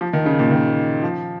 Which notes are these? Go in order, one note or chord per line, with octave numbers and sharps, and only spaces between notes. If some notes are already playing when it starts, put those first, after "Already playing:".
F3
D#3
C#3
A#2
D#3
F3